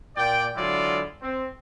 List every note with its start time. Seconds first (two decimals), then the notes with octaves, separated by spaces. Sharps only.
0.16 A#2 D5 G5
0.56 D3 F#3 G#3 E4 F4 D5
1.22 C4